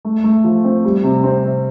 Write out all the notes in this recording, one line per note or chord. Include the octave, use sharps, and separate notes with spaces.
A3
A3
F3
C4
G3
C3
C4
C3